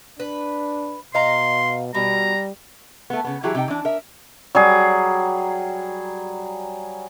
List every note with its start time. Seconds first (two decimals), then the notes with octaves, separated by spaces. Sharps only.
0.20 D4 B4
1.14 B2 D#5 F5 A#5 C6
1.94 B2 G3 A#5
3.10 A3 B3
3.25 C#3 B3
3.43 E3 F#3 E4 G4 G#4
3.55 C3 D#4 G5
3.68 E3 D4
3.85 A#4 E5
4.55 F#3 G3 G#4